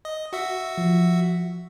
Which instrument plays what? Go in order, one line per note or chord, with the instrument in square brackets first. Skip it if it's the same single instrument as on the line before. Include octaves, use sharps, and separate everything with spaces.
[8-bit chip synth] D#5
F#4 E5
[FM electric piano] F3